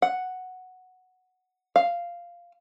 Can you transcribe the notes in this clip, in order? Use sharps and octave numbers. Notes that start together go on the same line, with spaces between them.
F#5
F5